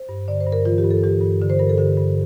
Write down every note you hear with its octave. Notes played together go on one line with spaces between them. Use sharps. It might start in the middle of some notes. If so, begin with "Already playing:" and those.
Already playing: C5
G2
D3 D5
C5
G2
A#4
E3 F4
G4
G2
A4
E3 G4
G2
D3
C5
G2 A#4
A4
D3 G4
G2